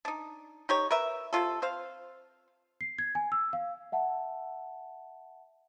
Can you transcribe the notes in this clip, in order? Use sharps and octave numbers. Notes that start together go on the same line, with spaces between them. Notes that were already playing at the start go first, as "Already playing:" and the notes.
D4 D#4
D#4 G4 C#5
A#4 B4 E5
C3 G#3 F4 A4
C4 C5 F5
C7
G#6
G#5
E6
F5
E5 F#5 A5